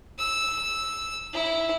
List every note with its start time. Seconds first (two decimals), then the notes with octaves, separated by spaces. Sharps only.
0.18 E6
1.33 E4